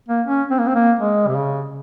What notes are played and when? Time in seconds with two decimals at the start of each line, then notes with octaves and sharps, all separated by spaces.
0.08 A#3
0.26 C#4
0.51 C4
0.58 A#3
0.67 C4
0.75 A#3
0.99 G#3
1.27 C3
1.36 C#3